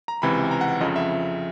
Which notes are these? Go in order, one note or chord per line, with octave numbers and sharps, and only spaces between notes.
A#5
C#2 C3 E3 B5
A#5
F#5
F2 C#3 F3 D#5
E5